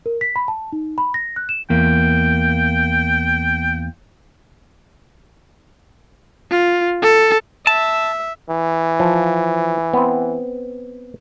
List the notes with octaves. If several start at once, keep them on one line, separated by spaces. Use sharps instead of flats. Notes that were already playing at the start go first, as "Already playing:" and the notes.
A#4
B6
B5
A5
D#4
B5
A#6
F#6
E7
E2 A#3 G5
F4
A4
E5 A5
E3
F3
B3 C4